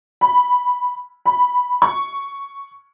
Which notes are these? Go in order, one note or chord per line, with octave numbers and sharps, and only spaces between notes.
B5
B5
C#6